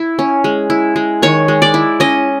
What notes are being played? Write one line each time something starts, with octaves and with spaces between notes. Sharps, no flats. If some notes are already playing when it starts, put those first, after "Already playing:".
Already playing: E4
C#4
G#3
E4
G#3
D#3 C#5
G#3
D5
E4
C#4 D#5